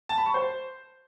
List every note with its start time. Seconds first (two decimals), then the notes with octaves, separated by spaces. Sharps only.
0.09 A5
0.18 B5
0.26 C#6
0.34 C5